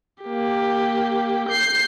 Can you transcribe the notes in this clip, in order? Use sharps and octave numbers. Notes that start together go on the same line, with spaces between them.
A#3 G4
G6 C7